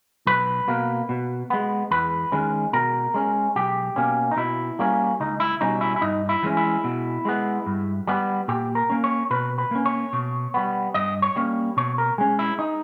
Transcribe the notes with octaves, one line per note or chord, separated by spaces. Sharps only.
B1 B4
B2 A#3
B2
G#3 B3
E2 B4
D#3 G#3 C#4
B2 A#4
G#3 C#4
B1 G4
B2 A#3 C#4
D#4
B2 E4
G3 A#3 C#4
C#2 D#4
E4
B2 G3 C#4 D#4
E4
E4
G2 D#4
E4
E3 G#3 C#4
E4
B2
G#3 B3
G2
G3 B3
A#2 G4
A#4
A#3 C#4
C#5
B2 B4
B4
A#3 C#4
C#5
B2
G3 B3
G2 D#5
C#5
G3 A#3 C#4
B2 C#5
A#4
G#3 C#4 G#4
E4
D#4